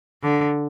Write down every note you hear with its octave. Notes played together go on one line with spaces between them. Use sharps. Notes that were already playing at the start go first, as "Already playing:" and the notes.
D3